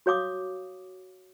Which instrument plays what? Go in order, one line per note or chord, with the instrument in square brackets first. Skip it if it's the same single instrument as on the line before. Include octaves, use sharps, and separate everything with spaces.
[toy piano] F#4 C#5 F5 D6 D#6